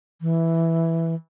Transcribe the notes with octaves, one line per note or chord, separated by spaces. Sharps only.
E3